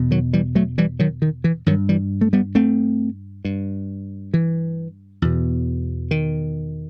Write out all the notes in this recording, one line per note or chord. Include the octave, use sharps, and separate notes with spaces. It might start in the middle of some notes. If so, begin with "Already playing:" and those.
Already playing: E2 B2
D#3 F#3
E3 G3
F#3 A3
E3 G3
D#3 F#3
D#3
E3
G2 D#3 F#3
E3 G3
A3
G3 B3
A3 C4
G2
E3
E2 B2
D#3